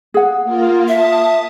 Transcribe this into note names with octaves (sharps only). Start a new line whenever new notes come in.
G#4 F#5
A#3 F4
E5 A5 D#6